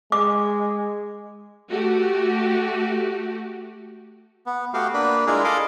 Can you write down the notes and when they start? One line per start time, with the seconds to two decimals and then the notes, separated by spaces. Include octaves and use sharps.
0.12 G#3 D6
1.70 A3 F#4 G4
4.46 B3
4.74 A3 B3 F#4 G4 F5
4.94 A#3 D4 B4
5.27 G#3 D4 E4 F4 G#4 A#4
5.44 F4 A4 D#5 F5 B5 D6